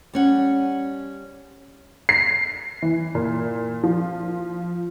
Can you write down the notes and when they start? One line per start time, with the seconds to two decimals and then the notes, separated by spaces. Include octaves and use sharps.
0.13 G3 C#4 F#5
2.09 C7
2.82 E3
3.15 A#2
3.83 F3